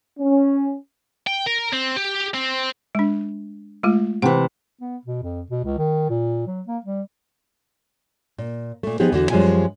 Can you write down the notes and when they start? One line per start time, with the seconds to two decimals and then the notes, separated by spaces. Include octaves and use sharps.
0.19 C#4
1.27 G5
1.46 A#4
1.73 C4
1.96 G4
2.34 C4
2.95 G#3 D4
3.83 G#3 A3 F4
4.22 C3 E3 F#5
4.81 B3
5.05 B2
5.23 F2
5.50 B2
5.64 C#2
5.78 D#3
6.09 A#2
6.47 F#3
6.67 A#3
6.85 G3
8.38 A#2
8.83 A#2 A3
9.00 F3 B3 D#4 G4 G#4
9.12 E2 D3 F#4
9.30 F#2 F3 G3 G#3 E4 G#5